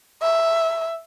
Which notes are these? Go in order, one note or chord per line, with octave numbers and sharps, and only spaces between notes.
E5